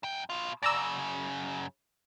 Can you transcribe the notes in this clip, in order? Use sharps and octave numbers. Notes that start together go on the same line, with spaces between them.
F#2 G5
B2 F4
F#2 C#3 D5 A#5 E6